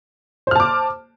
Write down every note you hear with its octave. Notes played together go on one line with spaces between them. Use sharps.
C5 A5 D6 F6